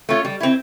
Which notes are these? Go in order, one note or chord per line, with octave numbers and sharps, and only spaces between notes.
A3 C#4 F4
G3
C4 E4